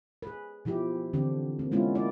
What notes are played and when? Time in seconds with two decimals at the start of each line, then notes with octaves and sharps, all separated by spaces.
0.22 G#4 B4
0.65 B2 F3 E4 G4
1.13 D3 E3 C4 D4 G4
1.59 A#3 C4
1.72 G#3 A#3 B3 C#4 E4 F4
1.95 A#3 E4 D5